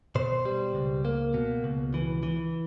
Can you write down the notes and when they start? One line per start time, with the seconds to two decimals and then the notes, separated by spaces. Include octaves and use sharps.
0.15 B2 C5
0.45 G3
0.75 C#2
1.05 A#3
1.34 B2
1.64 C#2
1.94 E3
2.23 E3